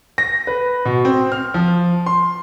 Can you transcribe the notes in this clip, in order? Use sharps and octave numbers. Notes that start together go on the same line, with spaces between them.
A#6
B4
B2
C4
F6
F3
C6